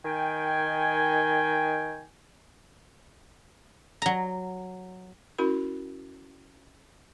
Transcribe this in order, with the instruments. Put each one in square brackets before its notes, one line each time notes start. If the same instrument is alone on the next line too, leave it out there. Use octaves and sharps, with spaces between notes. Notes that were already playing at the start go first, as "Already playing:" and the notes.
[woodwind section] D#3 G5 G#5
[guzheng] F#3 A#5
[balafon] C#4 E4 F#4 A#4 B5